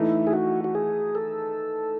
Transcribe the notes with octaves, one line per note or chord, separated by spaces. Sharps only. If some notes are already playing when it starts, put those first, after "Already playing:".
Already playing: E3 A3 D#4 E4
G#4
F#4
F#4
G#4
A4